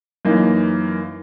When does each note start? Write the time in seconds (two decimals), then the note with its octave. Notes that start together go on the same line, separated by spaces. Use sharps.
0.25 F#2 E3 A#3 D#4